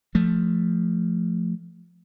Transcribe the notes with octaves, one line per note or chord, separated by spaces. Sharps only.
F3 A3